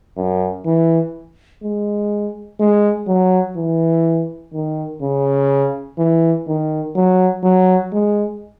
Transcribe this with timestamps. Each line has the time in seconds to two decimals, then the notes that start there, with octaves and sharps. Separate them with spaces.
0.17 F#2
0.66 E3
1.63 G#3
2.60 G#3
3.08 F#3
3.57 E3
4.53 D#3
5.02 C#3
5.98 E3
6.48 D#3
6.96 F#3
7.44 F#3
7.93 G#3